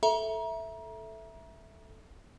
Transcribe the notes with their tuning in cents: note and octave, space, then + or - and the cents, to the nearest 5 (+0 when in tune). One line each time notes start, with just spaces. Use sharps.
A4 +0 E5 +0 A#5 +30